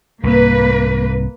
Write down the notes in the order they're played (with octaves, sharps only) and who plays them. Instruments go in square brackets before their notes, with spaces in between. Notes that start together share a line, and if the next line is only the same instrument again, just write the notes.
[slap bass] C2 G#2 [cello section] A#3 B4